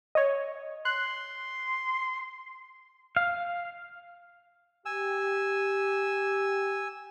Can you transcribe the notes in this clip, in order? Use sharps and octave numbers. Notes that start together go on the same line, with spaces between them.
C#5 D#5
C6 F#6
F5
G4 G#5 E6